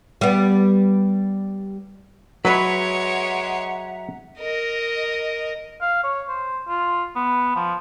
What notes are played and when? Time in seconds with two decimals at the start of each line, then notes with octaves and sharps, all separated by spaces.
0.21 G3 B3
2.45 F#3 G#3 B4 C#5 E5 F#5 A#5 B5
4.40 A#4 D#5
5.81 F5
6.04 C#5
6.28 C5
6.69 F4
7.16 B3
7.56 F3